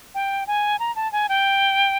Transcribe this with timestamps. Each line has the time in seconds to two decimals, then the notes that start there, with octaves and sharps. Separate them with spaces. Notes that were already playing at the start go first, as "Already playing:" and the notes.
0.15 G5
0.47 G#5
0.79 A#5
0.96 A5
1.12 G#5
1.29 G5